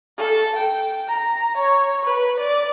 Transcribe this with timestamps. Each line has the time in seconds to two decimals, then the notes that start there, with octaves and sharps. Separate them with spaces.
0.18 A4
0.56 G5
1.09 A#5
1.57 C#5
2.04 B4
2.40 D5